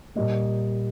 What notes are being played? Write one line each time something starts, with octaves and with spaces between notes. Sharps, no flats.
A#2 G3 A#3 D#5